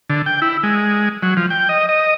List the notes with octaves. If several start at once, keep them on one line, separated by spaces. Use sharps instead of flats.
D3
G5
E4
G#3
F#3
F3
G5
D#5
D#5